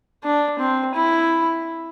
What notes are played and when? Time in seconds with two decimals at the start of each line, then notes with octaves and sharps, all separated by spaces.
0.23 D4
0.59 C4
0.95 E4